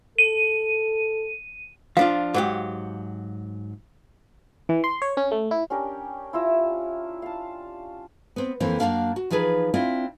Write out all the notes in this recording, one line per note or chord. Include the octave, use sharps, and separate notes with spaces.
A4 D#7
F3 D4 F4 F5
G#2 F#3 G4
E3
C6
C#5
C#4
A3
E4
C#4 D4 G4 A#4
E4 F4 E5 A#5
F5 A5
B3 C4
F2 E3 A#3 C4
F#2 D#3 A#3 D4 F5
F#4
E3 F3 D#4 G#4 B4
C4 D4 E4 F4